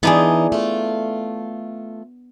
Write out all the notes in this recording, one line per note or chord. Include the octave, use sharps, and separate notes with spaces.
E3 B3 D4 D#4 G#4
A3 F4